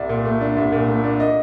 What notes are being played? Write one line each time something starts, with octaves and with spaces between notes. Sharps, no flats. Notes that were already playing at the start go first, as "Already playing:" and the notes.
Already playing: C2 D5
A#2
A3
D4
C2
A#2
A3
D4
D#5